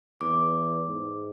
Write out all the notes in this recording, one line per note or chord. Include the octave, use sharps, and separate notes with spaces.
E2 D6
G#2